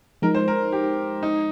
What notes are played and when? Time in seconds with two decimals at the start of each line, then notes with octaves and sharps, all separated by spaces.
0.22 F3 G#3 D#4 A#4
0.35 C5
0.48 A#4
0.72 G4
1.23 D#4